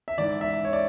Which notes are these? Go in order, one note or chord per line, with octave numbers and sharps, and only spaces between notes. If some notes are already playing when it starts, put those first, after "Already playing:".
E5
G#2 E3 D5
E5
C#5
D5